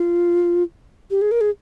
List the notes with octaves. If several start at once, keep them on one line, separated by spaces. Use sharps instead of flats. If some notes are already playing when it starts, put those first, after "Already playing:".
Already playing: F4
G4
G#4
A#4
G#4